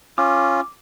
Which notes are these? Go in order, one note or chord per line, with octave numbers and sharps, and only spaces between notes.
C#4 F4 D6